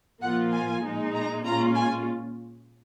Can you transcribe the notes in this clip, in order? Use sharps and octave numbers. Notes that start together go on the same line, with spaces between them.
A#2 F3 A#3 F4 F#5
G#5
A#2 G#3 D#4
A#5
A#2 G#3 C#4 F4 A#5
G#5